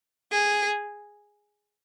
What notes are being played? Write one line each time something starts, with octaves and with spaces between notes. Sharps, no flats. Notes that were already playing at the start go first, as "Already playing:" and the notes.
G#4